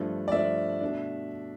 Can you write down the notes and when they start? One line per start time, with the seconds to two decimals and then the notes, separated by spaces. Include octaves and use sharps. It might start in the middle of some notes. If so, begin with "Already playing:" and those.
Already playing: G2 F3 A3 D4
0.28 D5
0.32 G2 F3 A3 D4 E5
0.81 B2 A3 D4